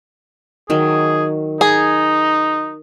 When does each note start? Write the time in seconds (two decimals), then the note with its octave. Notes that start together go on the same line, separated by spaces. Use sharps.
0.70 D#3 F#3 G#4
1.61 D#4 G#4